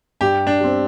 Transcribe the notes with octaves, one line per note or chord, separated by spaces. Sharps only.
G2 G4
D4
G3 C4